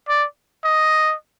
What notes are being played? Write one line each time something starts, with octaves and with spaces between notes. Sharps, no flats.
D5
D#5